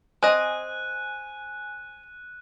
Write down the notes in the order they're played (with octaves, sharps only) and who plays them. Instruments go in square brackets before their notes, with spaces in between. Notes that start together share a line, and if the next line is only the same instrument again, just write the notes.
[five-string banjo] C4 D#5 [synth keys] G#5 [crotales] F#6 D#7